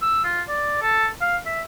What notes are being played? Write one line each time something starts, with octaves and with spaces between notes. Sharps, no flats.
E6
F4
D5
A4
F5
E5